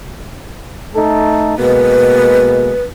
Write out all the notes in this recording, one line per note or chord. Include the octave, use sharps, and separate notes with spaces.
A3 D#4 A4
B2 G#3 A#3 B4